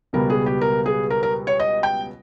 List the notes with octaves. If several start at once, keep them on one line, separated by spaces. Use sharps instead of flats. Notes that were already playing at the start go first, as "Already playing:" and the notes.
C#2 B2 G3 B3 A#4
G#4
G4
A#4
G#4
A#4
A#4
C#5
D#5
G5